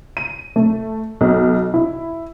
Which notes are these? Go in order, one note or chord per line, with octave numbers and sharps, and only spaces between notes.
D#7
A3
B1
E4